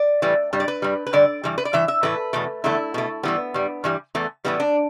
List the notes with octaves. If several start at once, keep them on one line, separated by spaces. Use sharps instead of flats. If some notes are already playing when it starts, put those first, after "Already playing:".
Already playing: D5
A2 E3 G3
G2 G3
D5
B4
G2 G3
B4
G2 D3 G3 D5
G2 E3 G3
B4
D5
G2 E3 E5
E5
A2 E3 A3 B4
E2 B2 A3
E2 D3 A3 E4
B2 A3
G2 E3 G3 B3
G2 G3
G2 E3 G3
E2 E3 A3
A2 E3 G3 B3
D4